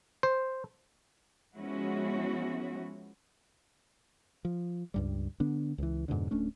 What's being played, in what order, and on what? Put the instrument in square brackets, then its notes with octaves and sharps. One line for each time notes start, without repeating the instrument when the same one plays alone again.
[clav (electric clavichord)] C5
[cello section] F3 G#3 B3 C#4 E4 F#4
[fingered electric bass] F3
C#2 G2 G3
D3 B3 D4
C#2 E3
F2 G#2 B2 D3
D1 A3 C#4 D4